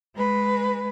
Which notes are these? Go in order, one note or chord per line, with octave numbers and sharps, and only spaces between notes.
G#3 B4